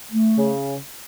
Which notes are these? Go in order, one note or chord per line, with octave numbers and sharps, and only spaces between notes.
A3
C#3